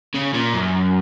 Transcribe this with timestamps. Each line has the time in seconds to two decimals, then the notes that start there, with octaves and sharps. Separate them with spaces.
0.14 C#3
0.33 A#2
0.53 F#2